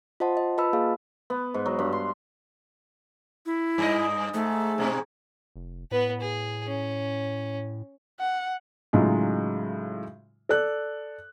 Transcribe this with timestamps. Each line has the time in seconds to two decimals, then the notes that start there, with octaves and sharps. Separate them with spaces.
0.20 F4 C5 D#5 F#5 A5 C6
0.37 D#5
0.58 F4 B4 D#5 A5 B5 E6
0.73 A#3 G#4 F5
1.30 B3
1.54 G#2
1.66 F#3
1.79 G2
1.92 C6
3.46 E4
3.78 G2 D#5
4.34 G#2 A3
4.78 G#2 B2 C4
5.56 F1
5.91 A2 B3 B4
6.21 G#4
6.67 C#4
8.20 F#5
8.93 A2 C#3 F#3 G#3 D#4 F4
10.49 A4 D5 F#6